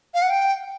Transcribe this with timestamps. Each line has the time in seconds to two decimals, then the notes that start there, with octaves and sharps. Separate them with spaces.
0.14 F5
0.22 F#5
0.30 G5